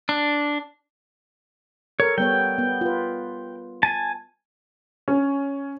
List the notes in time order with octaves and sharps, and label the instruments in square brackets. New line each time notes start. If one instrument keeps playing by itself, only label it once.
[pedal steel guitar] D4
[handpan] A4 A#4 [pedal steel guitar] C#5
[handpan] G3 B3 C#5 [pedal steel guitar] G5
[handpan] B3
F4 B4
[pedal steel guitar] G#5 A5
[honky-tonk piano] C#4